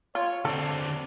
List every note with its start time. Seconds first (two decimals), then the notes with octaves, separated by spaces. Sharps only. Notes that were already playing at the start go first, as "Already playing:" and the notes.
0.15 F4 C#5
0.45 D3 C4 A4 D5